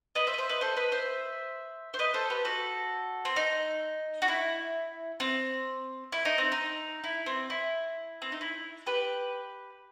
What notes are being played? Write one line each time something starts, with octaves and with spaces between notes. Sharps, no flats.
B4 D#5
C5 E5
D#5
C5 E5
B4 D#5
A4 C5
B4 D#5
C5 E5
C5
B4 D#5
A4 C5
G4 B4
F#4 A4
C4
D#4
F#4
E4
C4
E4
D#4
C4
D#4
E4
C4
E4
C4
D#4
E4
G4 B4